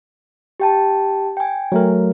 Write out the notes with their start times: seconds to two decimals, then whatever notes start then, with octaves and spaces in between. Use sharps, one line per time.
0.60 G4 G5 A5
1.37 G5 G#5
1.72 F#3 A3 A#4